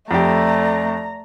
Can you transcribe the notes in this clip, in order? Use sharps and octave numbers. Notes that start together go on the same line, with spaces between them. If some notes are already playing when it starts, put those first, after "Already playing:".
F2 A3 G4 D5 A#5